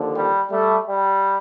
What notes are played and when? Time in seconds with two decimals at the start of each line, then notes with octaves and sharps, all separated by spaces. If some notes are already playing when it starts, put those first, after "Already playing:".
Already playing: D#2 D3 F3
0.16 G3
0.51 G3 A3
0.87 G3